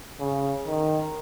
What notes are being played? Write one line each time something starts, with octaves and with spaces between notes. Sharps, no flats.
C#3
D#3